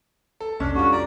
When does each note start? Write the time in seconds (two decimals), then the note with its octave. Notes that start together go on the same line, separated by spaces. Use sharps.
0.41 A4
0.60 C2 F2 C#4 D4
0.75 G3 D4 F4 F#4
0.92 D5 A#5